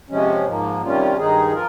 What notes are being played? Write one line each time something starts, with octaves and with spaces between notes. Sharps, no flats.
C3 F3 G#3 C#4
G#2 F3 A#3
C3 D#3 G3 C#4 F4
G2 D#3 G#3 D#4 G#4
F3 F4 A#4